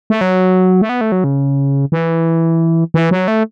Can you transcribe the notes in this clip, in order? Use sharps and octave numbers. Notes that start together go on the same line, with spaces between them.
A3
F#3
A3
B3
A3
F#3
C#3
E3
E3
F#3
A3